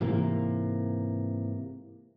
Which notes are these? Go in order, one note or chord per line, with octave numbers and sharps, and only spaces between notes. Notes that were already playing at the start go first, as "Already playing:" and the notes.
G#2 C3 E3 A#3